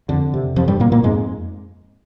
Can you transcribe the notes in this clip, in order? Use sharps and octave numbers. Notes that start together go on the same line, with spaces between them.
F2 D3
C3
F2 C3 F3
G2 G3
F2 A#2 A#3
A#2 A#3
F2 G#2 G#3